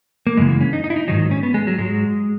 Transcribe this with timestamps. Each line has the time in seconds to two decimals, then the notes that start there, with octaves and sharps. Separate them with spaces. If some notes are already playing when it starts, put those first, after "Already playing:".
0.27 A#3
0.37 F#2 C#3 E3 G#3
0.49 A#3
0.61 C#4
0.73 D#4
0.84 D#4
0.90 E4
0.96 D#4
1.08 G#2 D#3 F#3 D#4
1.31 C#4
1.43 B3
1.54 G#3
1.67 F#3
1.78 G#2 F#3 G#3